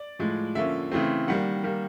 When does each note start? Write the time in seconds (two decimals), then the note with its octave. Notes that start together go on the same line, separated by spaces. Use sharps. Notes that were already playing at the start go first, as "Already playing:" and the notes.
Already playing: D5
0.19 A2 F3 G#3
0.55 D3 F3 A#3 C#4 E5
0.92 C#3 E3 A3 C4
1.27 D#3 G3 A#3 F#5
1.63 D#3 G3 A#3